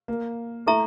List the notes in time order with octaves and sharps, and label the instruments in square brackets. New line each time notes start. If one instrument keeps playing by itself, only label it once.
[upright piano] A#3
[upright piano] A3 [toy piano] E4 A4 E5 A#5 C#6